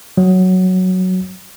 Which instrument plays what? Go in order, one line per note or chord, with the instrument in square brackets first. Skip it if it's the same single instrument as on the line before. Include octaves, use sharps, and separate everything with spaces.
[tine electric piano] F#3